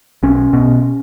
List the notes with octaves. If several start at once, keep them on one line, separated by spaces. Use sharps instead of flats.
B1 C#4
B2